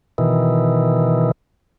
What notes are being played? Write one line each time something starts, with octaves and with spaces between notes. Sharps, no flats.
B2 D#3 E3